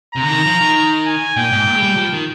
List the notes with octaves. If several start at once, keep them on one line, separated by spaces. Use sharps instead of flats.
C3 A#5
D3
D#3
F3
D#3
G#5
A#2 G5
G#2
A#2
G#3
G3
F3
D#3